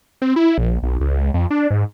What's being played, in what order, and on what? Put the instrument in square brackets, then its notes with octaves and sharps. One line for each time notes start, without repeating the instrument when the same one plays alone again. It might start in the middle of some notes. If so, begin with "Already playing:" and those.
[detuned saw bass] C4
E4
A#1
B1
C#2
F2
D4
G#2